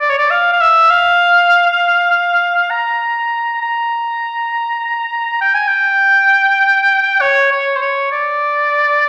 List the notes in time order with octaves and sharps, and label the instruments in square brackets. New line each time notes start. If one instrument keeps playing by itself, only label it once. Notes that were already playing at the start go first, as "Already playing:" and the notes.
[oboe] D5
C#5
D5
F5
F5
E5
F5
A#5
A#5
G5
G#5
G5
C#5
C#5
C5
C#5
D5